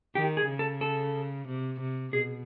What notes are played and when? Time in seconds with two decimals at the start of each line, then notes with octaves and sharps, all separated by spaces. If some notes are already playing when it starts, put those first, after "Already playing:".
0.15 D#3 G4
0.37 G#4
0.48 C#3
0.59 A4
0.81 A4
1.47 C3
1.80 C3
2.13 B2 G#4